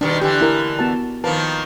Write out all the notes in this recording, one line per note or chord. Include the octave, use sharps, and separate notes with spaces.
B2 D#3 G3 D4
D3 E3 G4
E4 A#4
B3 F#4 A5
D#3 F3 A#3 B4 A5